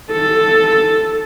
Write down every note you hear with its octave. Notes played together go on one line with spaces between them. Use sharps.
A4